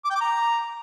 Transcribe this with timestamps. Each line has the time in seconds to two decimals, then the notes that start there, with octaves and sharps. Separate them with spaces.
0.05 D6
0.10 G5
0.16 D6
0.21 A#5